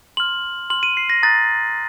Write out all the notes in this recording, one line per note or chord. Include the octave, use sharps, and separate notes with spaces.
C6 F6 F#7
C6 F6 F#7
D#7
C7
A#6
A#5 D#6 F#6 A6